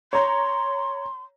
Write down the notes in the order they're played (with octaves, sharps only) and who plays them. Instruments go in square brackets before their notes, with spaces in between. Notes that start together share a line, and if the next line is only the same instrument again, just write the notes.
[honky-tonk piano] C#5 A#5 [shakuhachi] C6